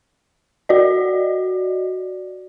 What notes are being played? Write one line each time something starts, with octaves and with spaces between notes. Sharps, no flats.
F#4 D5 D#5